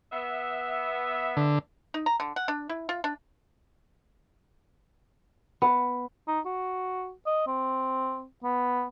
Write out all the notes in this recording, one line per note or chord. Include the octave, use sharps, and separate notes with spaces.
B3 E5
D3
D#4
A#5
D3
F#5
D4
E4
F4
D4
B3
D#4
F#4
D#5
C4
B3